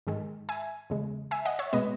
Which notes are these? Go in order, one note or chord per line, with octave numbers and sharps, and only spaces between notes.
G#2 D#3 G#3
E5 G#5
E2 C#3 G#3
E5 G#5
D#5 F#5
C#5 E5
B2 G#3 B3 B4 D#5